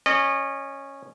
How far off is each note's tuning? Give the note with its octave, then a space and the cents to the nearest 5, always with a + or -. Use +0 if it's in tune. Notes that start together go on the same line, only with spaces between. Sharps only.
C#4 -10 D#5 -35